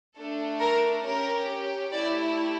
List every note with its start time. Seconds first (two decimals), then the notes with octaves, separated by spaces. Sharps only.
0.17 A3 D4 A4
0.60 A#4
1.04 C#4 G4 A#4
1.92 A3 E4 G4 D5